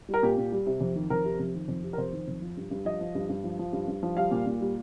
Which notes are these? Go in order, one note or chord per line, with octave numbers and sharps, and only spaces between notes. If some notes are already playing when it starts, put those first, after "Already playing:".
G3
A#4
A#2 G4
A#2
G3
C3
F2
D#3
F2 A#4
C3
F2
D#3
F2
C3
A#4
F2 C5
D#3
F2
F3
G2
G2
F3 D#5
F3
G2
G2
F3
F3
G2
G2
F3
G3 F5
A#2
A#2
G3